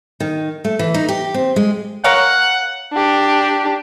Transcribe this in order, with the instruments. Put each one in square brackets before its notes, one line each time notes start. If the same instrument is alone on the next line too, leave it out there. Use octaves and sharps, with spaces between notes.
[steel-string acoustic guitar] D#3
A3
E3
D#4
G4
C4
G#3
[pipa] A#4 C#5 F5 [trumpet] F#5
[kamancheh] D4 G4